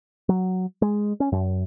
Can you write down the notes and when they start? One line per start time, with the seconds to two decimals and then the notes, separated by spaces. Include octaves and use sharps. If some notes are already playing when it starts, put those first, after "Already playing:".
0.29 F#3
0.82 G#3
1.20 C#4
1.32 F#2